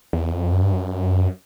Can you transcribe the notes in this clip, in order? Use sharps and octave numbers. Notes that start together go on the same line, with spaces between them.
E2
F2
F#2
G2
F#2